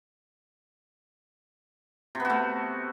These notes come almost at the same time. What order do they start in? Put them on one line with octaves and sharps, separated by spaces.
C3 B3 F#4 A3